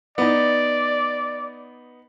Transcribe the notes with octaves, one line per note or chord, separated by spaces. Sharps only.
B3 D#4 D5